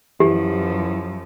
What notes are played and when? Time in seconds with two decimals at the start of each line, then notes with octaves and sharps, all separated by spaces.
0.20 F#2 E3 F3 G4